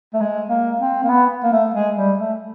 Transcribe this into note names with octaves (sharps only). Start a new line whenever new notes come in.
A3
G#3
A#3
C4
A#3
B3
A#3
A3
G#3
G3
A3